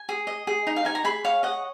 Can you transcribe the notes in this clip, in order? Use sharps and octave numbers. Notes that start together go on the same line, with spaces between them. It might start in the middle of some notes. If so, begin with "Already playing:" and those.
Already playing: G#5
G#4
D#5
G#4
D#4
F5
D#4 G#5
A#5
G#4 B5
C#5 F5
D#5 F#5